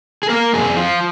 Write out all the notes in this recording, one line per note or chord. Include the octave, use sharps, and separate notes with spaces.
G#4
A#3 A#4
F2 G#4
F3 F4